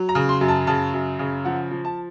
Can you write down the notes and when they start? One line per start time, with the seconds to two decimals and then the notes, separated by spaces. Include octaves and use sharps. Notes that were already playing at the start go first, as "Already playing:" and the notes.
Already playing: F#3
0.09 A#5
0.15 C#3
0.29 C6
0.41 F#2
0.48 A5
0.67 C#3 A5
0.94 F#2
1.19 C#3
1.45 F3 F#5
1.71 F3
1.85 A5